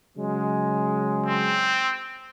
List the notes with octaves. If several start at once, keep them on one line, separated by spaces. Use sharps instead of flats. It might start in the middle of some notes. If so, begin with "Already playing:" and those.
C#3 F#3 G#3
C4